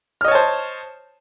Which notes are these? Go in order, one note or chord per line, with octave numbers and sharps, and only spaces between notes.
C5 C#5 D#5 A5 F6